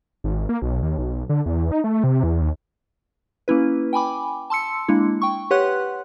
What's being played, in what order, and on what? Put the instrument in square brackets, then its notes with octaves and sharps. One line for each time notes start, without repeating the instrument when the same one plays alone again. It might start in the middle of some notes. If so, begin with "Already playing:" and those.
[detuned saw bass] G#1
A#3
B1
D#2
B1
D3
E2
D#4
A3
C3
E2
D#2
[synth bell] A#3 C#4 E4 B4
G5 G#5 B5 D6
A5 C6 E6 C#7
G#3 A#3 D4 E4
G5 C#6
G4 B4 C#5 F#5 C6 F#6